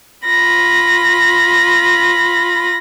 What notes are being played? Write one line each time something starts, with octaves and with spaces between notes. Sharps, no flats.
F4 B5 A#6